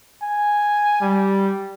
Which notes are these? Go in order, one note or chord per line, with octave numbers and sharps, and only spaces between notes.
G#5
G3